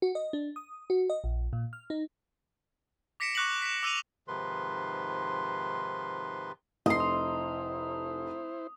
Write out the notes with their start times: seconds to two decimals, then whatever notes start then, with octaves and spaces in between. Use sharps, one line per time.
0.02 F#4
0.15 D#5
0.33 D4
0.56 D#6
0.90 F#4
1.10 D#5
1.24 A#1
1.53 A#2
1.73 F6
1.90 D#4
3.20 D6 A#6 B6 C#7 D7 E7
3.35 C#6 D6 F#6 A#6 C#7 F#7
3.62 B6 E7
3.83 D6 E6 A#6 D#7 F7
4.28 G#2 C3 D#3 F3 B4 C6
6.86 F1 E4 C5 D#5 C6
7.00 D#6